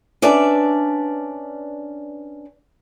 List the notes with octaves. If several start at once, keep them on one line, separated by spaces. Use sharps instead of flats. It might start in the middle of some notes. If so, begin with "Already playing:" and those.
C#4 D4 B4 D5 E5 A5